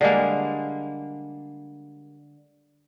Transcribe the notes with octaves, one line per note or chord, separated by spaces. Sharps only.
D3 G3 G#3 A#3